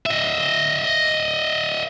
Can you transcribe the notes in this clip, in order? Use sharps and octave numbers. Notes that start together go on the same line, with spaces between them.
D#5 E5